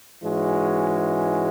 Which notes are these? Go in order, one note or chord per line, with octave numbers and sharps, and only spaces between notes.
G#2 E3 G#3 C#4 F#4